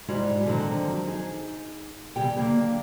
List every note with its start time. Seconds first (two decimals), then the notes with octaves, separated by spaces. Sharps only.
0.08 G#2 G3 G#3 E4 F#4
0.45 D3 D#3 F3 F#3 G#3 C4
1.06 D#4 G#4
2.16 E2 C#3 G3 G4 G5
2.36 D3 F#3 A#3 D4